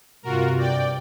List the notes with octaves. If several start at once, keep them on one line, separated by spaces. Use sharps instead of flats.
G2 C3 F4 F#4 A#4
D5 G5